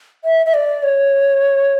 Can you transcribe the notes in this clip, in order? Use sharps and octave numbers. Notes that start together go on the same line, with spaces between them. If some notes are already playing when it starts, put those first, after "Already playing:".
E5
E5
D5
C#5